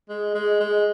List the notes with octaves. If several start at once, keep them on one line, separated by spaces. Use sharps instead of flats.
G#3
G#3
G#3